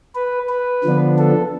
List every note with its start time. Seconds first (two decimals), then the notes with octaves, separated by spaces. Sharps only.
0.15 B4
0.49 B4
0.84 D3 F3 B3 D4
1.18 A4